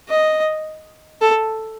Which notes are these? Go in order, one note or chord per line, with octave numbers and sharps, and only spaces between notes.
D#5
A4